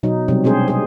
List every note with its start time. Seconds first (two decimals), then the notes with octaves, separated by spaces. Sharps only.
0.03 B2 F#3 D#4
0.28 C3 F#3 G3 C4
0.44 B2 G#3 C4 D4 G#4 C5
0.68 G#4 C5